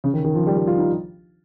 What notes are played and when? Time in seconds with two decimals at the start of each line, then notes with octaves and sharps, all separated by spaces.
0.04 C#3
0.14 D#3
0.24 D#3
0.35 F3
0.47 G3
0.57 G3
0.67 F4
0.78 D#4